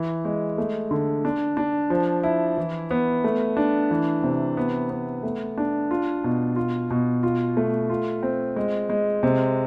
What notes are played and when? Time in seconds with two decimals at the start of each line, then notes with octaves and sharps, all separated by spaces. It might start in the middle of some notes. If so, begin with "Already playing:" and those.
Already playing: E3
0.25 G#3
0.58 A3
0.91 D3
1.25 D4
1.57 D4
1.90 F3
2.23 E4
2.57 E3
2.91 B3
3.24 A3
3.57 D4
3.91 E3
4.23 C3
4.57 B3
4.90 B3
5.23 A3
5.58 D4
5.91 F4
6.24 B2
6.56 F4
6.90 B2
7.23 F4
7.57 A3
7.90 F4
8.23 C4
8.56 G#3
8.90 G#3
9.23 C3